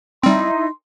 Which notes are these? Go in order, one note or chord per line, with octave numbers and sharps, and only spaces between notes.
G3 C4 D#4 E4 C6